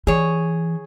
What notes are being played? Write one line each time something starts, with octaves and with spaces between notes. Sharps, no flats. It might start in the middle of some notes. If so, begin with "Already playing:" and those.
E3 G#4 C#5